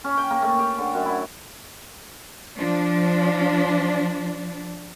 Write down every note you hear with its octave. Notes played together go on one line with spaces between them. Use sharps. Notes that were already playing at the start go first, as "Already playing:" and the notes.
C#4
G5
A#3
A3
G4
D3
F#2
E4
F3 D4